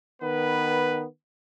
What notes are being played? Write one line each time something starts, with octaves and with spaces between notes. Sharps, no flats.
D#3 B3 B4